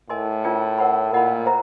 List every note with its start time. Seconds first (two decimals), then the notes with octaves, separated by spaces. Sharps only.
0.10 A2 A#4 D#5 G#5 C6
0.44 C#4 F4 A#4 D5 G5
0.78 A#4 C#5 F#5 B5
1.12 A#2 A#4 D#5 F#5 B5
1.46 C5 E5 A#5